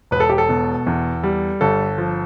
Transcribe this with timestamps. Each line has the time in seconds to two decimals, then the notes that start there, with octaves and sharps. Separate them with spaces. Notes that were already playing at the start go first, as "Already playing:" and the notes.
0.11 E1 B4
0.20 A4
0.29 G4
0.38 A4
0.49 B2
0.87 E2
1.23 G3
1.61 G1 A4
1.98 F3